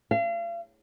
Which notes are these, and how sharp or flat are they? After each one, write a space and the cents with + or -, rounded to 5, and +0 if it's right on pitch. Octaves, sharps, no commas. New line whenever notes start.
F5 -40